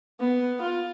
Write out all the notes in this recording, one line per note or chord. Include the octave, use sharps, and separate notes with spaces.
B3
F4